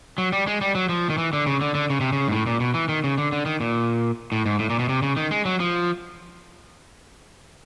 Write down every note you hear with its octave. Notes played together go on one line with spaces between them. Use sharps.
F#3
G3
G#3
G3
F#3
F3
D#3
E3
D3
C#3
D3
D3
C#3
C3
C#3
G#2
A2
A#2
B2
E3
D#3
C#3
D3
D3
D#3
A#2
A2
G#2
A2
A#2
B2
C3
C#3
D#3
G#3
F#3
F3